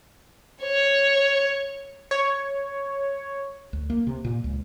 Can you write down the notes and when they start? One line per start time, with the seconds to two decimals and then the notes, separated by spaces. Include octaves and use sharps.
0.63 C#5
2.11 C#5
3.73 D2
3.90 A#3
4.07 C3
4.24 A#2
4.44 C#2